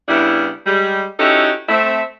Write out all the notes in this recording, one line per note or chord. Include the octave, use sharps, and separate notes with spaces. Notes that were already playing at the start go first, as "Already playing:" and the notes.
C#3 G3 B3 D4 E4
G3 G#3
C#4 D#4 E4 F#4 G4 A4
A3 C4 E5